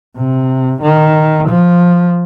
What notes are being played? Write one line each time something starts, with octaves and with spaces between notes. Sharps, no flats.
C3
D#3
F3